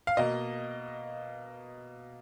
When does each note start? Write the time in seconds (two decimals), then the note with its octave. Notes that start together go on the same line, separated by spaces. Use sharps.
0.07 F5
0.17 B2 A#3 D#5